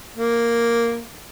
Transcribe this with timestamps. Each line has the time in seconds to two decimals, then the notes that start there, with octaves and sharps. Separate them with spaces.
0.16 A#3